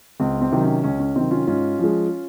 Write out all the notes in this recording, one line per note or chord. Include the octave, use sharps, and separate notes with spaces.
C#2 C4
C4
C3 D#3 F#3
C#4
C#2 C#4
C#4
C3 D#3 F#3 C4 D#4
C#4 F4
G#2 C#4 F4
F3 G#3